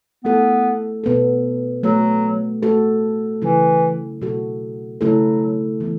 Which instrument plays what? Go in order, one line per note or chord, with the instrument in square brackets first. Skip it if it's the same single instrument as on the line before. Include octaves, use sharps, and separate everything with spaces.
[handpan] A3 E4 A4 [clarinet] B3
[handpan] B2 B3 A4
[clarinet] F#3 [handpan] A3 F#4 A4
[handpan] A3 F#4 A4
[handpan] C#3 F#3 C#4 E4 [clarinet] E3
[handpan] B2 F#3 A3 F#4 A4
[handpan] C#3 A3 E4 A4 [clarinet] F#3
[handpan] E3 B3 E4